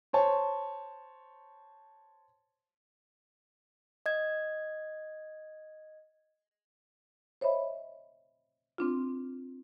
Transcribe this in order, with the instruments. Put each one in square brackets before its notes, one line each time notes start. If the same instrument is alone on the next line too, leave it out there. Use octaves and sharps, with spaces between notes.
[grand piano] C5 C#5 A5
[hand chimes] D#5 G#6
[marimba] C5 C#5 D#5 E5 B5
C4 D4 F4